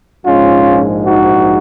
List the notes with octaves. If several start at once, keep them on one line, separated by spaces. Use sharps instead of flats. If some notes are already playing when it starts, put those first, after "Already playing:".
A#1 G#2 F3 G#3 C#4 F4
D#4 F#4